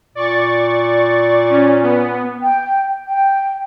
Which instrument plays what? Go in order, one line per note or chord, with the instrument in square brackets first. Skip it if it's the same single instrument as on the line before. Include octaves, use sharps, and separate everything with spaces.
[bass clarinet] A#2 [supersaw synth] D5 C#6 A6
[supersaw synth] C#4
B3
[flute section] G5
G5